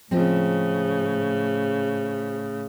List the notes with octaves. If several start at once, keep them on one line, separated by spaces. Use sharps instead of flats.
A2 C#3 F3 G#3 C4